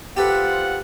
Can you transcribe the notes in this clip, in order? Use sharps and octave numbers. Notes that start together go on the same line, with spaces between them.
F4 G4 A4 B4 C5 F#5